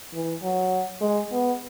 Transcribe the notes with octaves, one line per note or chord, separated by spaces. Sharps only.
E3
F#3
G#3
B3